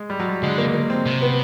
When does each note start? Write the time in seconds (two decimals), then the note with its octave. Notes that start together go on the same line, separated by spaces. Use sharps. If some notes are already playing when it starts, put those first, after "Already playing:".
Already playing: G#3
0.10 G3
0.20 F#3
0.29 G3
0.43 D3 G#3
0.58 A#3
0.74 A#3
0.90 C4
1.05 C3 C4
1.22 B3